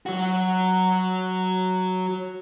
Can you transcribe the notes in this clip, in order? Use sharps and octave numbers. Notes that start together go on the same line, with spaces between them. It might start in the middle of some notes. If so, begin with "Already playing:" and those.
F#3 F#4